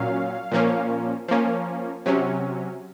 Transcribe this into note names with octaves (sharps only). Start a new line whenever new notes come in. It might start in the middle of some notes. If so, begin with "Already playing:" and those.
Already playing: A#2 F#3 C#4 F5
A#2 F3 A#3 C#4
F3 A#3 C#4
C3 F#3 C#4